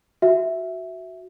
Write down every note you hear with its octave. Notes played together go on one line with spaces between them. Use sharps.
F#4 E5